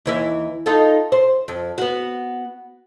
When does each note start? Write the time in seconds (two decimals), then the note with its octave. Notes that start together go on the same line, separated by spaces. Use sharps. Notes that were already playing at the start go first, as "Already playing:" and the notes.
0.06 D#2 E3 E5
0.66 D#4 F4 A4
1.12 C5
1.48 F2
1.78 B3 F#4